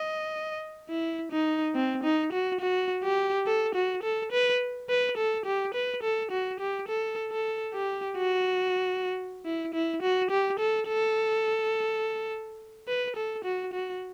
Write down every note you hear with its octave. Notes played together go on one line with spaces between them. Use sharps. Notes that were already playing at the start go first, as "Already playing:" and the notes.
Already playing: D#5
E4
D#4
C4
D#4
F#4
F#4
G4
A4
F#4
A4
B4
B4
A4
G4
B4
A4
F#4
G4
A4
A4
G4
F#4
E4
E4
F#4
G4
A4
A4
B4
A4
F#4
F#4